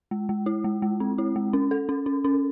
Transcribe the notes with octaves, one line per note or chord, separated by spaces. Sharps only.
G#3
G#3
E4
G#3
G#3
C4
E4
G#3
C#4
A4
C#4
C#4
C#4